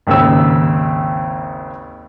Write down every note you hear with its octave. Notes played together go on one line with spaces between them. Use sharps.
G#1 D#2 C#3 E6